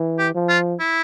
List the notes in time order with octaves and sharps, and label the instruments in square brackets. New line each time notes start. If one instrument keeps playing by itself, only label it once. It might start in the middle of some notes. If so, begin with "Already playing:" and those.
Already playing: [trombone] E3
[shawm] G4
[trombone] F3
[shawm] F4
E4